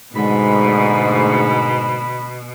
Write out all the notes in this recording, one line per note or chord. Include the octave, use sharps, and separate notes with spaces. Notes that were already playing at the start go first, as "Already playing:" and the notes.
G#2 B2 D3 G#3 A3 B5